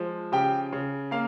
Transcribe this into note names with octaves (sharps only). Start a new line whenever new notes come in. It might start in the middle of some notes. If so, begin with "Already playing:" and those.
Already playing: F3 G#3
C#3 G4 G5
C#3
A#3 F5